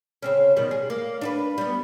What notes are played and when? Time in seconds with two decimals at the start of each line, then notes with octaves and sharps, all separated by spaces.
0.22 C#3 C4 C#4
0.57 B2 D#3 G3
0.71 G#4
0.90 A#3
1.21 D4 F#4 B4
1.58 G3 B3